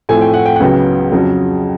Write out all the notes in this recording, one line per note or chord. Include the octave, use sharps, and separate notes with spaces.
A2 F3 A3 C4 G#5
G5
F#5
G5
F#5
C#2 C#3 F#3 B3 G5
F2 C#3 F#3